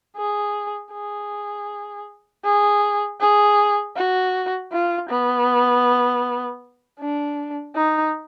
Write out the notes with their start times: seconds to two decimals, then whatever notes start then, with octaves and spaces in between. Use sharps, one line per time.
0.17 G#4
0.93 G#4
2.44 G#4
3.20 G#4
3.96 F#4
4.72 F4
5.09 B3
6.99 D4
7.76 D#4